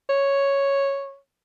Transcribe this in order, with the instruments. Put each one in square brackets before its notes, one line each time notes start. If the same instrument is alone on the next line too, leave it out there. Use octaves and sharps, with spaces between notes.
[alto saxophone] C#5